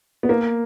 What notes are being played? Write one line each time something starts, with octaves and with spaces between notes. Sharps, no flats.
B3
A#3